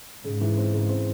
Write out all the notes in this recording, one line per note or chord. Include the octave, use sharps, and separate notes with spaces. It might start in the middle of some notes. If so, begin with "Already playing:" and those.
G#2 C#3
E3
C4
C#3
C4